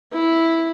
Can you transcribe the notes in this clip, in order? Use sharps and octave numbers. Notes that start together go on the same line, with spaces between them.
E4